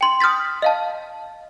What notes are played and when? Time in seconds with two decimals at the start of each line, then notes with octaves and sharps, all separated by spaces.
0.01 G5 C6
0.20 D#6 F6 G6 A6 B6
0.62 D#5 F5 A5